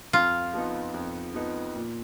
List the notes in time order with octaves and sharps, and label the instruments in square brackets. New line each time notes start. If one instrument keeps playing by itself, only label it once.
[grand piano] F2 [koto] F4
[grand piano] F3 B3 D#4
F2
F3 B3 D#4
A#2